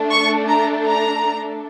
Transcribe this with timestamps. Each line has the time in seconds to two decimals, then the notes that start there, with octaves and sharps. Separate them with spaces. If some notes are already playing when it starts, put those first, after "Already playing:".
Already playing: A3 D4 A4
0.12 C#6
0.49 A#5
0.87 A#5